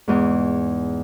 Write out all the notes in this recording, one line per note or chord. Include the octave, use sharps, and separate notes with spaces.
E2 G#2